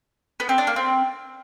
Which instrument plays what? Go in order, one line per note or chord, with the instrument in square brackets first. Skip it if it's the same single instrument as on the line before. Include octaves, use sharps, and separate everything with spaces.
[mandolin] B3
C4
D4
A#3
C4